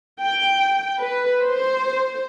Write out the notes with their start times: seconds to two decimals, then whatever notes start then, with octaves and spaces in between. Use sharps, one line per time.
0.21 G5
0.99 B4
1.43 C5